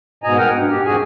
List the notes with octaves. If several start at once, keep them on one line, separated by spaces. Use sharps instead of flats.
G#2 B2 D#5 G#5 A#5
A#4 F#5 G5
G2
G4
F2 G#2 F#4 G#4 G#5